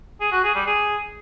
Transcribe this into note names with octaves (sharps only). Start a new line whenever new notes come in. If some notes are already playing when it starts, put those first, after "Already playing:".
G#4
F#4
G#4
G3
G#4